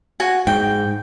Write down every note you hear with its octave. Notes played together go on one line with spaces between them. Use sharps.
F#4 G#5
G#2 G5